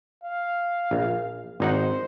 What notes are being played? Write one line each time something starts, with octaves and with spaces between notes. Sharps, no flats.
F5
A#1
G#1 D#4 C5 F#5